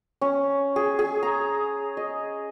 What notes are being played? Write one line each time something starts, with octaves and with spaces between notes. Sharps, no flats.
C#4
G#4
G#4
A#5
D#5